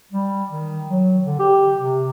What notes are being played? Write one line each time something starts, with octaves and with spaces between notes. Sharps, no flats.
G3
D#3
F#3
D3
G4
C3